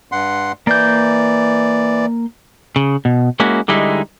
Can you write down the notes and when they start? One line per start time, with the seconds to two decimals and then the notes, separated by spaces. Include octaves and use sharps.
0.12 G2 F#5 C6
0.67 E3 A#3 D5 G6
2.76 C#3
3.05 B2
3.40 G#3 A#3 C#4 E4 F#4
3.68 D3 G3 G#3 D#4 E4